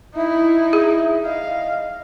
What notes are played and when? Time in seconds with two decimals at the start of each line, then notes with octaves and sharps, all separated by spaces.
0.14 D#4 E4 E5
0.73 G#4
1.25 D#5 F5